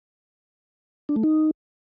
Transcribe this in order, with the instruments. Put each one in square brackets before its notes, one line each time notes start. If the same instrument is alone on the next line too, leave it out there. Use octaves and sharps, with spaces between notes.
[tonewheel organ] D4
A3
D#4